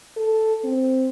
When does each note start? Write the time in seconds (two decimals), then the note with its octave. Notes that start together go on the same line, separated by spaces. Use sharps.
0.17 A4
0.64 C4